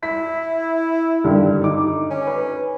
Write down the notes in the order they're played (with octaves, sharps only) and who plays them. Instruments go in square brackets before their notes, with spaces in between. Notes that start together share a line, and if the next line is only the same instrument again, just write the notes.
[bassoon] E4 [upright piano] B6
[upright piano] G2 D3 D#3
D#4 D6
[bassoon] C#4
[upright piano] B4